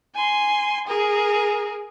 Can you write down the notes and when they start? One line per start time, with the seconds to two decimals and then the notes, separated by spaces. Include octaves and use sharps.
0.15 G#5 C6
0.87 G#4 A#4